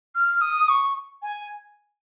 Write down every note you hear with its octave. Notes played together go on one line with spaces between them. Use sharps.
F6
D#6
C#6
G#5